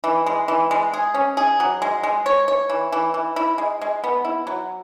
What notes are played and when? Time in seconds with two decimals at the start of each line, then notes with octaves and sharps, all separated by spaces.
0.04 E3
0.26 G#3
0.48 E3
0.71 G#3
0.94 G#4
1.14 C#4
1.37 G#4
1.60 F#3
1.82 G#3
2.03 G#3
2.26 C#5
2.48 C#5
2.70 E3
2.92 E3
3.14 E3
3.36 E4
3.58 G#3
3.81 G#3
4.04 B3
4.25 E4
4.47 F#3